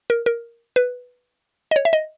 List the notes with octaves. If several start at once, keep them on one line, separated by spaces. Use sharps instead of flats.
A#4
A#4
B4
D#5
C#5
E5
D#5